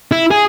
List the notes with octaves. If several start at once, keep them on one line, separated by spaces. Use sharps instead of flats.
E4
G#4